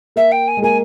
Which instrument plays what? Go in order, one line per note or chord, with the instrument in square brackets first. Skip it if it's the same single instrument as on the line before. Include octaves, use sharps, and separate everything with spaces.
[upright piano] A#3 [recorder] E5
[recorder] G5
G#5
[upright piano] G#3
[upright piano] A#3 [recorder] G#5